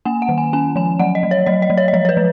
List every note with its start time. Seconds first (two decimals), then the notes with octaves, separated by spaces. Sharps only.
0.05 A#3 G#5
0.22 F#5
0.29 D#3
0.38 G#5
0.53 C#4 G#5
0.76 F3 G#5
0.99 F#3 F#5
1.15 D#5
1.23 F#3
1.31 C#5
1.46 F#3 D#5
1.62 D#5
1.70 F#3
1.77 C#5
1.88 D#5
1.93 F3 C#5
2.05 C#5
2.09 B4
2.17 F3